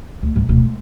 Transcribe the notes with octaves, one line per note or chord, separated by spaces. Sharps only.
D2
C2 G#2
D1 B2
G#3